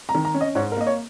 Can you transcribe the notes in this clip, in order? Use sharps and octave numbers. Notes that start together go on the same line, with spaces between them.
A#5
D#3
A#5
C#4
D#5
G#2 C#5
A#4
A#3 D#5
C#5